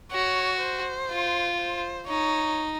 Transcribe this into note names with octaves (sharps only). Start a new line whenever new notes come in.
F#4 C#5
C5
F4
C5
D#4 C#5